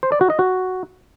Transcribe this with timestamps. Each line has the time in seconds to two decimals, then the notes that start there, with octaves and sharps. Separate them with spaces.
0.03 C5
0.12 D5
0.21 F#4
0.30 D#5
0.39 F#4